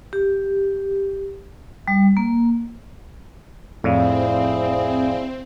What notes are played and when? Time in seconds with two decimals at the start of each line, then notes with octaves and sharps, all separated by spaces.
0.13 G4
1.88 G3
2.17 A#3
3.84 F2 A2 C4 E4 G#4 D5 F5